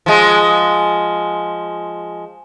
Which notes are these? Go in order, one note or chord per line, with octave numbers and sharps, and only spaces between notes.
F3 G#3